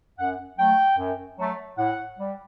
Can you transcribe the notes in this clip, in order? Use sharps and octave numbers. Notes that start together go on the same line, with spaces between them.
F#2 F#5
F#3 A3 G5
F#2
F#3 A3
A2 F#5
G3